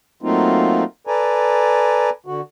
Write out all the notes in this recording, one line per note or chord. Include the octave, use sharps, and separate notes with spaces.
F#3 A3 A#3 C4 D#4 F4
A4 B4 D5 G#5 A#5
D3 F#4